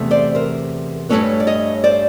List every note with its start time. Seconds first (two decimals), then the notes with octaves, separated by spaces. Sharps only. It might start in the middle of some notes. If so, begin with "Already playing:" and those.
Already playing: E2 C3 A3
0.11 C5 D5
0.35 A#4 C5
1.09 G2 E3 A3 C#4 B4 C#5
1.40 D5
1.47 C#5 D#5
1.84 C5 D5